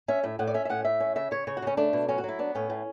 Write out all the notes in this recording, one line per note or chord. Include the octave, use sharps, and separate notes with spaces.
C#4 E5
A2 E5
A2 F#5
D5
C#4 E5
E5
A2 F#5
A2 E5
C#4
C#3 E5
C#3 C#5
C#3 C#5
F#4
C#3 C#4
A3 D4
B2
F#3 C#4
F#4
F#3 E4
B3 D4
A2 C#4
A2